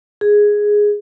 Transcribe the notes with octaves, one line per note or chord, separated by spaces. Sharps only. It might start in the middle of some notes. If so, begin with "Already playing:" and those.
G#4